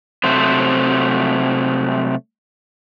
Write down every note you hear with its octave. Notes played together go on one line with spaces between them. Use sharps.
C3 F#3 A3 C5